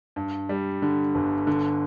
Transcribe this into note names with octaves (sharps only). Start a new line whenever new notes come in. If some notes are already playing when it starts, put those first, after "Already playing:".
G2
G3
D3
G1
D3